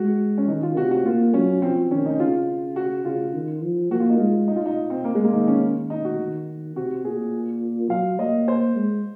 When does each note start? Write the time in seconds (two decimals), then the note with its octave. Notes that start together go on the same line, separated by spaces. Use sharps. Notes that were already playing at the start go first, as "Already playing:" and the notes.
Already playing: G#3 F#4
0.38 C#4
0.48 D#3 D#4
0.63 F4
0.77 C3 F#4
0.91 F#4
1.06 A#3 F4
1.34 F#3 C#4
1.62 F3 C4
1.91 D#3 C#4
2.06 D#4
2.20 C#3 F4
2.76 F#4
3.05 C#3 F4
3.34 D#3
3.63 F3
3.91 A#3 F#4
4.00 F4
4.10 D#4
4.19 G#3 F4
4.48 D#4
4.56 F4
4.66 D#4
4.90 C4
5.04 A#3
5.15 G#3
5.24 A#3
5.33 D#3 D#4
5.48 C#4
5.90 D#4
6.05 F#4
6.20 D#3
6.76 C3 F#4
7.05 A#2 G#4
7.90 F#3 F5
8.19 A#3 D#5
8.48 C5
8.76 G#3